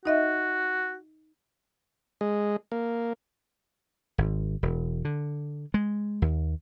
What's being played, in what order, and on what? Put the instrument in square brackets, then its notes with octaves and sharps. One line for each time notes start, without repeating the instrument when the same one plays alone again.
[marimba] D#4 D#5 E5 [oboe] F#4
[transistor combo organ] G#3
A#3
[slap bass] G#1
E1
D3
G#3
D#2